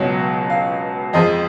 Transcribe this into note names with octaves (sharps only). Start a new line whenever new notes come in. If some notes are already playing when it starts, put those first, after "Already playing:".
Already playing: C#2 B2 F#3 C#5
F5
F2 F3 G#3 D#5